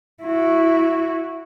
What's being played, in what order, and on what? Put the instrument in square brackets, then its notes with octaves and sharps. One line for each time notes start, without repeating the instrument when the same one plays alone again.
[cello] E4 F#4